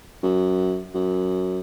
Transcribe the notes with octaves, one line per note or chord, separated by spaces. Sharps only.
F#2
F#2